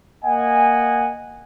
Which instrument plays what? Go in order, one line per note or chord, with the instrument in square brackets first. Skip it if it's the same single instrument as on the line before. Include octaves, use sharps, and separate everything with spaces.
[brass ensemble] A#3 D#5 F#5 G#5